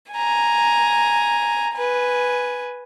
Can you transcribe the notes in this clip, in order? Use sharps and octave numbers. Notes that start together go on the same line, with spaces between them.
G#5 A#5
B4 G#5